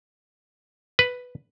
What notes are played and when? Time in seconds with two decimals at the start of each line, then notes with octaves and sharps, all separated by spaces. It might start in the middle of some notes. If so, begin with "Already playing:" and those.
0.99 B4